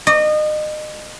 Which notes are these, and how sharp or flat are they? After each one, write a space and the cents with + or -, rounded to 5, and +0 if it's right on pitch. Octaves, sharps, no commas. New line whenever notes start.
D#5 -30